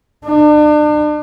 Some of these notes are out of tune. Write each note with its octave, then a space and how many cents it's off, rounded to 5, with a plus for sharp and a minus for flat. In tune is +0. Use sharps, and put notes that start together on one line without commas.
D4 +40